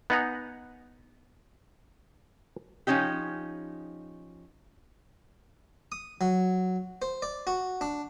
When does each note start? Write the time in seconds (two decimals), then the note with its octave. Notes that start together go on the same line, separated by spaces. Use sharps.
0.10 B3 D#4 F#5 G#5 A#5
2.87 F3 A3 C#4 D#4 G4
5.92 D#6
6.21 F#3
7.02 C5
7.22 D5
7.47 F#4
7.81 D4